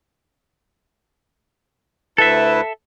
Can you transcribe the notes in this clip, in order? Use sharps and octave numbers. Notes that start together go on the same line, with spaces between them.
D2 E4 A4 B4 E5